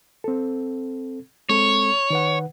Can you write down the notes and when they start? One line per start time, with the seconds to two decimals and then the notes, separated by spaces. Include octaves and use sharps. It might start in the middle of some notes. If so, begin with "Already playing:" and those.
0.24 C4 A4
1.49 G#3 C4 A4 C#5
2.10 D#3 B4 F#5